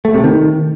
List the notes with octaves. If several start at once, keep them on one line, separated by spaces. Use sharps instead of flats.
A3
C3
D#3